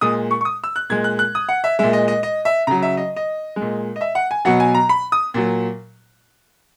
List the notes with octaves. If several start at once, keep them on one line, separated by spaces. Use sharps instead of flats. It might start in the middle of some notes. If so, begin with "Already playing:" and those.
A#2 G#3 D#6
C#6
C#6
D#6
E6
F#6
A#2 G#3 G#6
F#6
F#6
D#6
F#5
E5
A#2 G#3 E5
D#5
D#5
D#5
E5
C#3 F#3 A#5
E5
D#5
D#5
G#3
A#2
D#5
E5
F#5
G#5
B2 F#3 F#5
G#5
A#5
B5
D#6
A#2 F#3